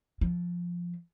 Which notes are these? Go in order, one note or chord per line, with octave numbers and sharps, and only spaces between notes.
F3